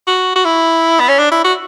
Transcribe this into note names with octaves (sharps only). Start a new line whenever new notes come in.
F#4
F#4
E4
B3
C#4
D4
E4
F#4